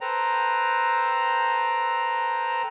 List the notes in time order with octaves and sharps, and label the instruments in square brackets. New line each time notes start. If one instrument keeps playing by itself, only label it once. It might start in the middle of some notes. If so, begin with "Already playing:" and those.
[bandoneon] A4 B4 C5 G5 A#5